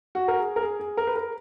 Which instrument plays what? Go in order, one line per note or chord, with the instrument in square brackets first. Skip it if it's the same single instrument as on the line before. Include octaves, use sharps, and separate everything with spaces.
[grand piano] F#4
A#4
G#4
A#4
G#4
G#4
A#4
B4
A#4